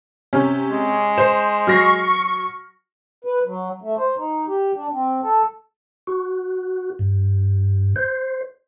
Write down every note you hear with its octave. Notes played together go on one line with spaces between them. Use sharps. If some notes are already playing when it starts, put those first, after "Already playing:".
C3 C#4
G#3
C5 E7
F#3 C#6 F6 A#6 C7
B4
F#3
A3
C5
D#4
G4
D4
C4
A4
F#4
G2
C5